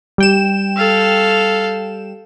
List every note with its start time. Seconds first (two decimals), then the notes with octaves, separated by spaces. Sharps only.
0.18 G3 G5 E7
0.77 A4 F5